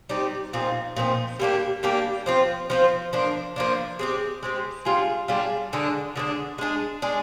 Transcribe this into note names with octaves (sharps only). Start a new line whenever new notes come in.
G3 C4 D#4 G4
A#2 F3 C4 D#4
A#2 F3 C4 D#4
G3 A#3 D4 G4
G3 A#3 D4 G4
F3 C4 F4
F3 C4 F4
F3 A#3 D4
F3 A#3 D4
G#3 C4 G4
G#3 C4 G4
G3 D4 F4 G#4
G3 D4 F4 G#4
D3 G#3 D4
D3 G#3 D4
G#3 D4 G#4
G#3 D4 G#4